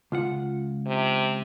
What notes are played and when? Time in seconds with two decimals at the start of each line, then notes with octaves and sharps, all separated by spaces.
0.12 C#2 F4 F#5
0.87 C3